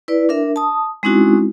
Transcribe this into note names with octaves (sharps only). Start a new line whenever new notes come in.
E4 B4 D5
D4 A#4 E5
A5 D#6
G#3 C4 C#4 D#4 E4 F#4